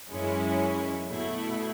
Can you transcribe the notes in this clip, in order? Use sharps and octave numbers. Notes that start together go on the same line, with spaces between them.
F#2 E3 G#3 C#4 E4
B2 A3 E4